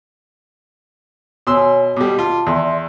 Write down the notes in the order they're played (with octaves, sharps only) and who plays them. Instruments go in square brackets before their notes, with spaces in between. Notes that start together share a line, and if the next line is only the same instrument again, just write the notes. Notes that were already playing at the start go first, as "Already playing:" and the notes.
[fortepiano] B2 C6 E6 [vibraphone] C#5 G#5
[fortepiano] B2 G3 [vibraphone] D6
[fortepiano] F4 [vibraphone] A5
[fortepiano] E2 [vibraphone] D5 E5 C6